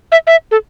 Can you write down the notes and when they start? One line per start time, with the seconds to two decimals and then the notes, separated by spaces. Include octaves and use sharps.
0.12 E5
0.27 E5
0.51 A4